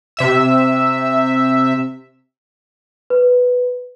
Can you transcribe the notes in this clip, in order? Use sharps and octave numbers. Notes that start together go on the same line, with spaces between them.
C3 E5 E6
B4